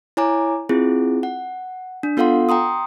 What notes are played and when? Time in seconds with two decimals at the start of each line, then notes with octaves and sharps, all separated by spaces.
0.17 E4 C#5 G#5 A#5 D6
0.69 C4 E4 F4 G#4
1.23 F#5
2.03 D4
2.17 B3 F4 A4 F5 F#5 C6
2.49 G5 A#5 C6 D#6